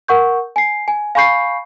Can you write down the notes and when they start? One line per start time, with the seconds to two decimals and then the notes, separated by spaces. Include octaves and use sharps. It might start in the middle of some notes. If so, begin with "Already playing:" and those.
0.08 A#4 F#5 C#6 G6
0.56 G#5 C7
0.88 G#5
1.15 F5 G#5 B5 C#6 G6 C7